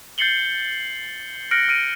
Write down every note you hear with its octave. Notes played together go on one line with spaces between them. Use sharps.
G6 A6 C7 C#7 F#7 G7
F6 F#6 A#6 C#7 D7 F#7
F6 D7 D#7